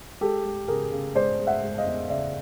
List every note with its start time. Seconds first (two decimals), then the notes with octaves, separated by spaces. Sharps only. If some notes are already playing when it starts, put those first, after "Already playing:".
0.21 G#3 G4 A4
0.45 G#3
0.68 C#3 G#4 A#4
0.92 C#3
1.15 G#3 C5 D5
1.39 G#3
1.47 E5 F#5
1.63 G#3
1.78 D#5 F5
1.86 E2
2.09 C#3 D5 E5